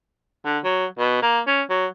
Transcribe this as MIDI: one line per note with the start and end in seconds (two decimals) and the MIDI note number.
0.45 0.59 50
0.64 0.86 54
0.98 1.21 47
1.22 1.40 58
1.47 1.62 61
1.70 1.87 54